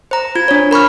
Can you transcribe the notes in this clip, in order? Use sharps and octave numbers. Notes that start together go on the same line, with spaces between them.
C5 A#5
F4 G#6
D4 C#5
A#4 B5 C#6 F6